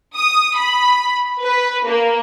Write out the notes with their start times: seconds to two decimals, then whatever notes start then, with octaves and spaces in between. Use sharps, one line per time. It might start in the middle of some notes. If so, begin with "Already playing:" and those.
0.16 D#6
0.56 B5
1.42 B4
1.87 A#3